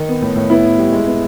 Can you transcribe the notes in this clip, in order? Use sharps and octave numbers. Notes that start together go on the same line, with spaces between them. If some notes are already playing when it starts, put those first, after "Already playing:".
Already playing: D#3 D#4
B3
A2
A2
B3 E4
B3
G3
G#3
B3